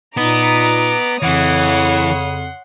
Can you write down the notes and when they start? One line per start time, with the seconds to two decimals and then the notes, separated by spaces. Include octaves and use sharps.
0.17 A#2 B3 D#4 D#5 A#5 D6
1.22 F2 C#3 E3 C#5 F#5 C6 D#6